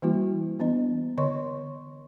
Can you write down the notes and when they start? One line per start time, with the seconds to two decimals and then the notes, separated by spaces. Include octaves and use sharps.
0.02 E3 G3 A#3 E4 F#4
0.59 E3 B3 D4 D#5
1.18 D3 C#5 D#5 C6 C#6